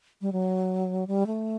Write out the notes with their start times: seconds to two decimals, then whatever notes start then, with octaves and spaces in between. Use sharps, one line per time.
0.22 G3
0.32 F#3
1.07 G3
1.27 A3